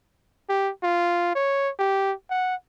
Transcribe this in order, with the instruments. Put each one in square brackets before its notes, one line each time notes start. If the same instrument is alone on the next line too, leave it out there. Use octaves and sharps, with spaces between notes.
[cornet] G4
F4
C#5
G4
F#5